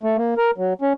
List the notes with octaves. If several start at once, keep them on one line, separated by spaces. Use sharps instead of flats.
A3
A#3
A#4
F#3
C#4